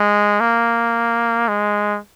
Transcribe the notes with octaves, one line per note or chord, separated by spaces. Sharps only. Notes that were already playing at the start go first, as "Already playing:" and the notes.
Already playing: G#3
A#3
G#3